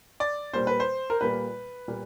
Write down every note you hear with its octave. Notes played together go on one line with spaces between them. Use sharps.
D5
A#2 G3 A#3 C5
B4
C5
A#4
A#2 G3 A#3 B4
A#2 G3 A#3